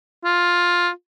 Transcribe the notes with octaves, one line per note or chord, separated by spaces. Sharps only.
F4